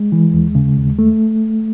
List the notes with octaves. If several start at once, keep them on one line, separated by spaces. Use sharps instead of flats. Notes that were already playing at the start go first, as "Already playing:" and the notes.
Already playing: G#3
E3
D#2
C#3
D#2
A3